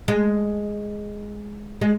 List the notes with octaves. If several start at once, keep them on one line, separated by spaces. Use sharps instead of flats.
G#3
G#3